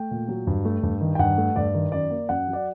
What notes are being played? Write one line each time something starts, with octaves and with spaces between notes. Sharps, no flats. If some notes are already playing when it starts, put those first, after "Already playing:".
Already playing: A3 G5
A#2
F#3
G2
A3
G2
D#3
G5
G2 F#5
A3
G2 D5
D#3
F#2 D5
A#3
F#2 F#5
F#3
D5